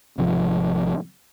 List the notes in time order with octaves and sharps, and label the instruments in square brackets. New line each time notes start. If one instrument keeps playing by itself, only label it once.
[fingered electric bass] G#1 C3 F3